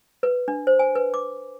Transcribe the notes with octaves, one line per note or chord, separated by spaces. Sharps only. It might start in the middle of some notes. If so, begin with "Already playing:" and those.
B4
D4
C5
G#5
B4
D6